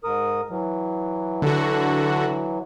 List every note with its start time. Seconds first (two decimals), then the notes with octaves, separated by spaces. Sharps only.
0.04 G#2 A#4 D#6
0.50 E3 F#3
1.42 D3 F#4